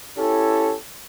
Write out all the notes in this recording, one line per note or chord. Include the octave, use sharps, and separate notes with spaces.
C#4 E4 G4 A4